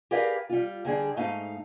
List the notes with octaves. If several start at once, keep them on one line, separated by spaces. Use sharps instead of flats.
G4 G#4 A#4 B4 D5 F5
G3 F4
D3 G3 G#4 D5
G#2 A3 D#4 F5